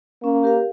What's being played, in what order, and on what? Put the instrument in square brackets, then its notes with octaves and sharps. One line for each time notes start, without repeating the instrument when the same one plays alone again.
[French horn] A#3 [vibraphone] C#4
[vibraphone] G4 A#4 F5